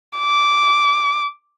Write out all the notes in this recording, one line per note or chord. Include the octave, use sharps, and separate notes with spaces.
D6